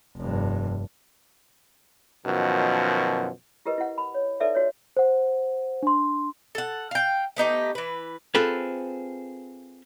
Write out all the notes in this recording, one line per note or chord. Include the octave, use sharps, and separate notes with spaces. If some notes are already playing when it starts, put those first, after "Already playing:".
F1 G2
F#2 B2 D#3 F3
E4 G4 A#4 B4 D#5
E4 F#5
B5
C#5
D#4 A4 B4 D5 E5
F#4 C#5
C5 F#5
D4 C6
A4 F#5
F5 G5
A3 B3 D#4 G4
E3 B4
C4 F4 G#4 A4 B4